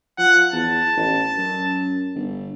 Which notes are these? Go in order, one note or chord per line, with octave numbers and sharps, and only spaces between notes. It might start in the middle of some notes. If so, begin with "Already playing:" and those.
F3 F#5
E2 A5
A1
F#2
G1